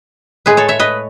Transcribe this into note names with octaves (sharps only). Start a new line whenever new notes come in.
A2 G#3 G#4 B4
A4 C#5
C#5 E5
B4 D#5